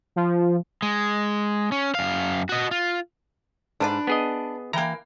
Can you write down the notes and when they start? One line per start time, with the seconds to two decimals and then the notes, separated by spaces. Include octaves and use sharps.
0.16 F3
0.82 G#3
1.72 C#4
1.95 F#2 F5
2.49 F#4 D#5
2.71 F4
3.80 G#2 D4 B4 D5
4.07 B3 G#4 D#5
4.73 E3 A#3 G5 A#5